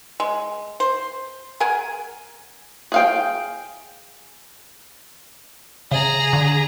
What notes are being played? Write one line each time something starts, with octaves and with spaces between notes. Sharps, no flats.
G#3
C5
G#4 A#4 F#5 G#5
G#4 F5 G5
C#3 G#4 A#5
D3